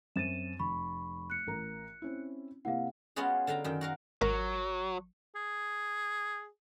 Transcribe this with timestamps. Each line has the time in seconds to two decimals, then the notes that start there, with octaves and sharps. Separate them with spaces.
0.16 F#2 C4 A6 D#7 E7
0.59 F1 B5 C#6
1.30 F#6 C#7
1.47 A1 A#4 A#5
2.02 C4 C#4 E4
2.65 C3 A#3 E4 F5 F#5
3.16 G#3 B3 C#4 F4 F#4 G#4
3.47 D3 F5 G5 A#5
3.64 F#2 D#3 G5
3.81 F#4 A#4 F5
4.21 G#1 F#3 A#4
5.35 G#4